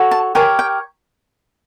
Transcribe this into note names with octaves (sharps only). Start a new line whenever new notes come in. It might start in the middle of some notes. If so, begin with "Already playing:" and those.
Already playing: F#4 A4 C#5
A5
G4 A#4 C#5 G#5
G5